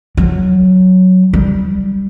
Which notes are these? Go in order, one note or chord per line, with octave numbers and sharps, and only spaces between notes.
F#3
G3